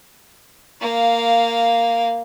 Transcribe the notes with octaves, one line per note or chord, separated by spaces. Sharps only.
A#3 F5